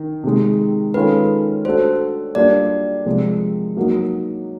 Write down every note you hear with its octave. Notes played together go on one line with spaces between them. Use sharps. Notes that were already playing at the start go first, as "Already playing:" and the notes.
Already playing: D#3
C3 D#3 G#3
D#3 G#3 C#4 F4 A4 B4
A3 D4 F#4 A4 C5
G3 A#3 D4 F4 A#4 D5
C3 F3 G#3
F#3 A#3 D#4 F#4